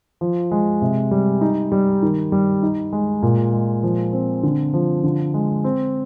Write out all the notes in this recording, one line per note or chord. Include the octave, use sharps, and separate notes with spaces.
F3
G#3
C3
G3
D#4
G3
D#3
G3
D#4
G#3
A#2
G#3
F3
C4
D3
F3
D3
G#3
C4